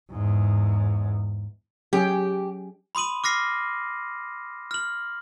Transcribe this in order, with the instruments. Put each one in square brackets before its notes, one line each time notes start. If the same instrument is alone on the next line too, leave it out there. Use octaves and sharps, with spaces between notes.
[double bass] E2 G#2
[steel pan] F#3 C#4 G#4 [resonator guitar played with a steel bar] G4
[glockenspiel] B5 C6 D#6 D#7 F#7
D6 F6 A#6 C7
F6 F#7